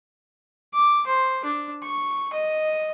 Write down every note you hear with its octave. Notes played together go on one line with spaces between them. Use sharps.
D6
C5
D4
C#6
D#5